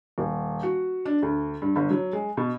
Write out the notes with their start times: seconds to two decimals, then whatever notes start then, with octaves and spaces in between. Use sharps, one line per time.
0.18 D#1
0.63 F#4
1.06 D4
1.22 D2
1.62 G2
1.76 G1
1.90 F#3
2.13 G#3
2.37 B2